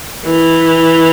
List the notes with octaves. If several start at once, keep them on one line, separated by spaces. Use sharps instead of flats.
E3